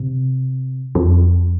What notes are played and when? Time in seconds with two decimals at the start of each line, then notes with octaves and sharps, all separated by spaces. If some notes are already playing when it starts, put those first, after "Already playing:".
Already playing: C3
0.95 F2